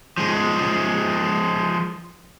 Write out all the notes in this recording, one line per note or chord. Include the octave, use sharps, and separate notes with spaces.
F3 G#3